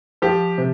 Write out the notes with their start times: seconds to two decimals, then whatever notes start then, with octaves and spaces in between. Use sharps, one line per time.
0.22 F3 G4
0.58 C3